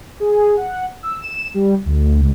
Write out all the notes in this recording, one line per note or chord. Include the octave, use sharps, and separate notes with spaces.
G#4
F#5
E6
E7
G3
D2
C#2